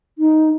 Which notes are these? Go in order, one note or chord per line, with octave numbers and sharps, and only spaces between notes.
D#4